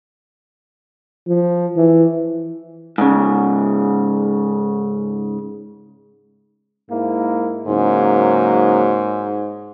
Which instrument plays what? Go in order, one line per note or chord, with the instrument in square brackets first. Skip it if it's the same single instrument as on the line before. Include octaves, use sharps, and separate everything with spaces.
[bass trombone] F3
E3
[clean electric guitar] G#2 C#3
[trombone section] G#2 A#3 E4
[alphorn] G#2 [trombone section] C#3 F#3 A#3